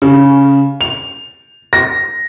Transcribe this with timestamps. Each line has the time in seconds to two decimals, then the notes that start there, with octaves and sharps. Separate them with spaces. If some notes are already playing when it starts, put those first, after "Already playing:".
0.02 C#3
0.81 F7
1.73 A#6